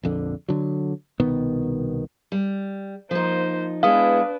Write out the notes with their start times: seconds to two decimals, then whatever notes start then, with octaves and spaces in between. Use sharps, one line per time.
0.03 A#1 F2 D3
0.49 D3 F#3
1.20 C2 B2 D#3 B3
2.32 G3
3.11 F3 A#3 D#4 C5
3.83 G#3 B3 D4 E4 B4 F5 D#6